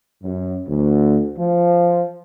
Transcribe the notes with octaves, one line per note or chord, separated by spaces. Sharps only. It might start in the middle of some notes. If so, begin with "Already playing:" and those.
F#2
D2
F3